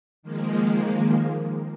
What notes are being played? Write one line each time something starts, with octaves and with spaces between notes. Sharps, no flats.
D#3 F3 G#3 A#3